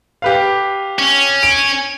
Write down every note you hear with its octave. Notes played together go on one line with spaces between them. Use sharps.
G4 B4 F5
C#4
D7